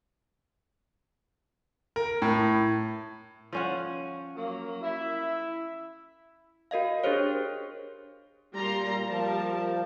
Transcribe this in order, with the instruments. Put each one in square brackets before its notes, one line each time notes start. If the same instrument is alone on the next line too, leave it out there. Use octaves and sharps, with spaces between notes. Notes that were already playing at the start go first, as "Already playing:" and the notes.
[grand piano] A#4
A2
[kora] F3 C#4 F#5
[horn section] F#3 A#3
E4 E5
[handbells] F#4 A#4 D#5 F5
D4 G4 G#4 A#4 C5 C#5
[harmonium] A#2 [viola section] G3 A#5 C6
[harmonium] F3 [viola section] G3 A#4 A5